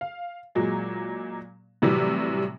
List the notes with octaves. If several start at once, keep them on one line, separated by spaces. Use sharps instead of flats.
F5
A#2 F#3 G#3
A2 C3 E3 F#3 G3